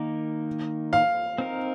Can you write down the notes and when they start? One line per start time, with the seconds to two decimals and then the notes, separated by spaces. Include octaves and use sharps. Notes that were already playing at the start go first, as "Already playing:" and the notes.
Already playing: D#3 A#3 D#4 G4 A#4
0.93 F5
1.38 C4 D#4 A#4